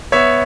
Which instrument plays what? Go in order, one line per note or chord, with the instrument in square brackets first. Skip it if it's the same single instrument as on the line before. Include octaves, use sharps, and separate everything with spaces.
[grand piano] B3 C#5 E5